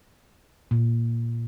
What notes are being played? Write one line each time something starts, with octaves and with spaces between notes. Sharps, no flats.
A#2